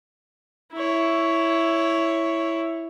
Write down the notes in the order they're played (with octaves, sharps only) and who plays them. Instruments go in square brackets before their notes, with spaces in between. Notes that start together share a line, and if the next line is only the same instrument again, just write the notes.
[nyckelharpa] E4 C#5